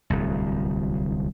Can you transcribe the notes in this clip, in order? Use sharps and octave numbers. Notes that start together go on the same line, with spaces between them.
D1 C2